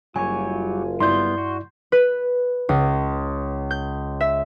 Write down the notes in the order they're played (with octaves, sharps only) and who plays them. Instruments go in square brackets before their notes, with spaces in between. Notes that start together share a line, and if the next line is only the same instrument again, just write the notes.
[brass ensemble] F#1 F#2 F4 [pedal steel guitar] F#3 G3 C#5 [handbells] G#5
[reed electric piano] G2 E4 D5 [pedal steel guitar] G3 B3 [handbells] C6 G6
[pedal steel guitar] F#4
[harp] B4
C#2
G6
E5